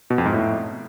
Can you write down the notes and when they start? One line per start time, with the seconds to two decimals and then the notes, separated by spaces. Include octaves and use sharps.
0.10 B2
0.18 F2
0.26 G#2
0.33 A2